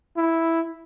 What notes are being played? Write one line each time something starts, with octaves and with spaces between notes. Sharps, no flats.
E4